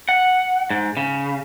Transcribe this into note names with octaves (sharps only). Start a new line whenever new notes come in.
F#5
G#2
C#3